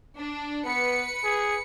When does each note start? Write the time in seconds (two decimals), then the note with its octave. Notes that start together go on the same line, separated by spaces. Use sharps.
0.18 D4
0.65 B3 B4 C#7
1.24 G#4